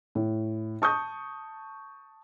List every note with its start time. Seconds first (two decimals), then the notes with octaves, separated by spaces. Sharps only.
0.15 A2
0.82 A5 C#6 D#6 G6